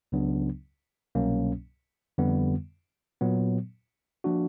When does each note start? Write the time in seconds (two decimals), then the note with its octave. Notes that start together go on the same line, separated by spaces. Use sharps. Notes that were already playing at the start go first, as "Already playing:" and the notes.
0.12 C#2 C#3 F#3 B3 D4
1.15 C2 B2 F#3 A#3 C#4
2.18 F2 D3 G3 B3
3.21 A#2 F#3 B3
4.24 F3 A#3 D4 F#4